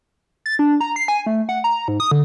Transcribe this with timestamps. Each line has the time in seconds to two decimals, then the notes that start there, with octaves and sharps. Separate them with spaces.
0.46 A6
0.59 D4
0.81 A#5
0.96 C7
1.08 G#5
1.26 A3
1.49 F#5
1.64 A#5
1.88 G#2
2.00 D#6
2.11 D3